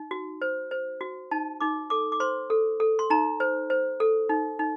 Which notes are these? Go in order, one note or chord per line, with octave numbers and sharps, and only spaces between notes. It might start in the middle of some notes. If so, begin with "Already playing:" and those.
Already playing: D#4
F#4
C5
C5
F#4
D#4 A5
D#4 D6
A4 D6
D6
C5 C6
A4
A4
C6
D#4 A#5
C5
C5
A4
D#4
D#4